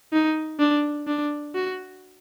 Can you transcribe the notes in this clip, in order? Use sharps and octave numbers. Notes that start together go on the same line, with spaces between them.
D#4
D4
D4
F#4